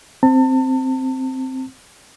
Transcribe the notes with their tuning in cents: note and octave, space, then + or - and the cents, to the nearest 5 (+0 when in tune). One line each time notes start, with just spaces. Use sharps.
C4 +0 A5 +35